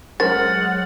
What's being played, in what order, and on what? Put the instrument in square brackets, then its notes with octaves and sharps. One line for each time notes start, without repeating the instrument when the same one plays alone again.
[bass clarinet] F#3 [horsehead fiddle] G#3 F#5 [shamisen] C#4 A#4 C5 [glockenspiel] F6 A6